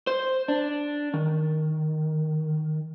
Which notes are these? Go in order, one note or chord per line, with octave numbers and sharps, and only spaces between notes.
C5
D4
D#3